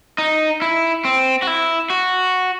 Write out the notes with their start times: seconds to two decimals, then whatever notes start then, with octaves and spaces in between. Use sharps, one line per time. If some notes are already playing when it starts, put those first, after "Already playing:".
0.18 D#4
0.62 E4
1.05 C4
1.42 F#4
1.47 E4
1.90 F#4